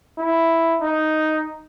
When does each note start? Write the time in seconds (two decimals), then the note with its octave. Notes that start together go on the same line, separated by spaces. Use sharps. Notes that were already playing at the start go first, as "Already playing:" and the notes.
0.18 E4
0.81 D#4